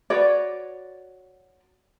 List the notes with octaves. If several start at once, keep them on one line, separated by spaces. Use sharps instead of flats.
F#4 B4 C#5 D5